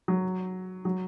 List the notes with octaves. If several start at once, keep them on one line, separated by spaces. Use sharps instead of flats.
F#3
F#3